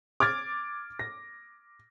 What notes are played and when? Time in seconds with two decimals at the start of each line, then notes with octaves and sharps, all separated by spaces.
0.20 D6 F6 G#6 A6
0.99 A#6